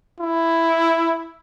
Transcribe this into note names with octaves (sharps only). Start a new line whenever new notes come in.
E4